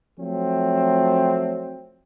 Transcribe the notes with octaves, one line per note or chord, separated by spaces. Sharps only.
F3 F#3 A3 C4